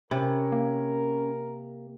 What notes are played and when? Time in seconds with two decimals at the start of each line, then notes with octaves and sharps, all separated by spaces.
0.11 C3 C#4 A#4 C#5 B5
0.52 A#3